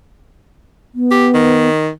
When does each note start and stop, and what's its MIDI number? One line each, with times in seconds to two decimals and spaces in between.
0.95 1.69 59
1.11 1.28 67
1.34 1.89 51